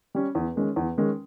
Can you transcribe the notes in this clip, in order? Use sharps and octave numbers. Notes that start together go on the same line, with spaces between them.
G3 C#4
E2
D#3 G#3 C#4
E2
D#3 G#3 C#4